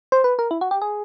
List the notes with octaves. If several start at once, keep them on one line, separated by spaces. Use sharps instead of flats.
C5
B4
A#4
E4
F#4
G4
G#4